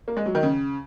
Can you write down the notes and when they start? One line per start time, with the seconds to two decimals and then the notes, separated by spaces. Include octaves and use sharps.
0.08 A#3
0.17 G#3
0.26 F#3
0.35 D#3
0.43 C#3